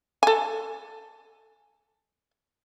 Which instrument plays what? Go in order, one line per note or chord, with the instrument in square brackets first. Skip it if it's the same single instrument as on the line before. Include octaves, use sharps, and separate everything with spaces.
[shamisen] A4 G#5